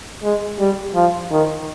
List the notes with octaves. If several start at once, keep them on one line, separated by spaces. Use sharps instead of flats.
G#3
G3
F3
D#3